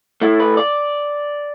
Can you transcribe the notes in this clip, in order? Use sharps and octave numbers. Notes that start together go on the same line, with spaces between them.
A2 A3 E4
B4
D5